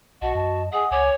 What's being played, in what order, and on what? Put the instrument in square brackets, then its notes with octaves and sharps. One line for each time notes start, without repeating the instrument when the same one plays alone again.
[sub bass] B1 [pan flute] F#4 [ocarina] D#5 [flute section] F#5 A5
[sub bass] F#2 [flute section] A5
[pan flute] G#4 [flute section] D#5 G#5 D#6 [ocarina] F#5
[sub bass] C#2 [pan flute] C#5 [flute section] G#5 D6